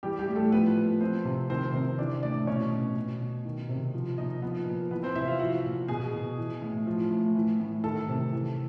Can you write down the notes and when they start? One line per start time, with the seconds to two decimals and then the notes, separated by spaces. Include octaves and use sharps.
0.03 E3 G3 G4
0.19 G3 G4
0.28 A2
0.36 A3 A4
0.52 F3 B3 B4
0.77 A#2
1.00 F3 C4 C5
1.25 C3
1.50 D#3 C4 C5
1.74 C3 C4 C5
1.98 E3 D4 D5
2.23 A2 D4 D5
2.47 B2 C#4 C#5
2.72 B2
2.96 B2
3.20 B2
3.45 D#3
3.69 C3
3.93 F3
4.18 A#2 D#4 D#5
4.42 F3 B3 B4
4.67 A#2
4.91 E3 B3 B4
5.03 C4 C5
5.15 C3 E4 E5
5.28 F4 F5
5.40 F3 F#4 F#5
5.64 A#2
5.88 B2 G#4 G#5
6.13 B2
6.37 E3
6.62 A2
6.87 F3
7.11 A2
7.35 E3
7.60 A2
7.84 D#3 A4 A5
8.08 C3
8.33 E3